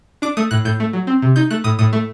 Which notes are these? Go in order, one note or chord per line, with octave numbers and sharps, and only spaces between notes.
D4 D6
A3 D#6
A2 F#6
A2 G6
A3
F#3
C4
C3
D#4 G6
A3 F#6
A2 D#6
A2 D#6
A3